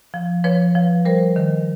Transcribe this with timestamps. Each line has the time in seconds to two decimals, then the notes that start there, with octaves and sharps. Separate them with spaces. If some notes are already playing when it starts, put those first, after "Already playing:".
0.14 F3
0.44 F3 B4 C#5
0.75 F3
1.05 G3 A#4 C5
1.36 D#3